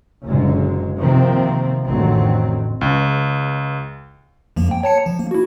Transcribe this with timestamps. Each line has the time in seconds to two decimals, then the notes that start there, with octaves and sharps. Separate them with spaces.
0.25 F#1 A#2 D3 G#3
0.98 C3 D#3 F3 A#3 C4
1.86 A1 F2 D3 D#3 F#3 C4
2.81 C#2
4.56 F2 F3 A#3
4.71 G5
4.83 C#5 A5 C#7
5.06 F3
5.19 A#3
5.31 E4 F#4